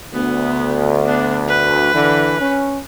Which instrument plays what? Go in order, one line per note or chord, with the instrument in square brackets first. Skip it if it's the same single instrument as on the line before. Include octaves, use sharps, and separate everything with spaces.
[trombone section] D2 [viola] B3
[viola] B3 D4
B4
[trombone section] D3 E3
C#4